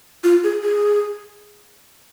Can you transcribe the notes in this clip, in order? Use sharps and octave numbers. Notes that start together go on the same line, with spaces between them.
F4
G#4
G#4